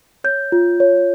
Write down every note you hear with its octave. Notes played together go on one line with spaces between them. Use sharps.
C#5 G6
F4
C#5